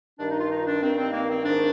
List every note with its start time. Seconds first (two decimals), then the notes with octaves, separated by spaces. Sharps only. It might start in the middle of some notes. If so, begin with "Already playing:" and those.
0.19 G2 D#3 D4
0.30 D#4
0.39 F4
0.51 D#4
0.66 D4
0.81 G2 D#3 C4
0.97 C4
1.12 A#3
1.29 C4
1.44 G#2 D#3 D4